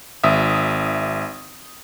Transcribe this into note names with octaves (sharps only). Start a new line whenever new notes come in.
G#1 E5 D#6